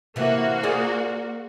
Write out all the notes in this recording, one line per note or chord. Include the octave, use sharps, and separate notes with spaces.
C3 E3 A#3 F#4
F4 G#4 D5